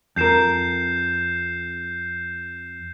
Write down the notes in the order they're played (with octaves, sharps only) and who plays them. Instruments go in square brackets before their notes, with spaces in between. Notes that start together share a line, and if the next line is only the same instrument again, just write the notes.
[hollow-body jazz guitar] F2 A#4 [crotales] G6 C7 E7